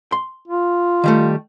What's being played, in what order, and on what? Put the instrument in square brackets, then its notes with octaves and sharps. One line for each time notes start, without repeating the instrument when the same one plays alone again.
[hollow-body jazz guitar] C6
[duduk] F4
[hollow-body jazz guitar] D#3 G3 A3